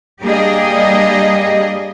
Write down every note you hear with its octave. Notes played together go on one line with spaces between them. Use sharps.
G3 A#3 D4 G4 G#4 D#5